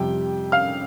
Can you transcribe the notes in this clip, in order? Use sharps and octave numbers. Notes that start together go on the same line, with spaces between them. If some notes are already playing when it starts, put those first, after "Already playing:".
Already playing: F2 C3 G3 G5
F5 F6